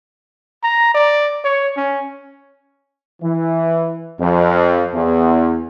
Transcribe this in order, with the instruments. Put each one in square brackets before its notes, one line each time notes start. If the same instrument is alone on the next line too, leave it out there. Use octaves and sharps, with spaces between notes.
[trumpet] A#5
D5
C#5
C#4
[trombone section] E3
F2
E2